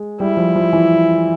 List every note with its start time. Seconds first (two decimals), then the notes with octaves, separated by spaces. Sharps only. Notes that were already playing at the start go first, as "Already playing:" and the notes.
Already playing: G#3
0.20 G3 E4
0.37 F3
0.56 F3
0.73 E3